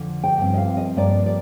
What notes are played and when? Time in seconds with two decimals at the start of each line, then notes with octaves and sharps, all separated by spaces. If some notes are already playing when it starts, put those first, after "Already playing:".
Already playing: F2 D3 F3
0.23 G5
0.38 G2 F3 C4 G5
0.53 D#5
0.58 F5
0.77 D#5
0.96 G2 F3 A#3 D4 D5
1.26 D5